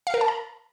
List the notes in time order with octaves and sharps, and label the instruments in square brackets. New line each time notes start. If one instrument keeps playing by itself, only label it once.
[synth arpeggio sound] F5
A#4
A5
A#5